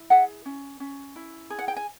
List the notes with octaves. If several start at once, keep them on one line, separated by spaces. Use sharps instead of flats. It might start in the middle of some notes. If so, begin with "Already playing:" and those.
Already playing: E4
G#4 E5 F#5
C#4
C#4
E4
G#4
F#5
G5
G#5